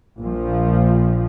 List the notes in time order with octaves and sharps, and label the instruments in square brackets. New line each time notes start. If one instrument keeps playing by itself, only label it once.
[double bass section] A#1 F3